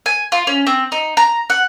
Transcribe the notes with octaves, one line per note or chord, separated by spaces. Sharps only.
G#5
F4
C#4
C4
D#4
A#5
F#5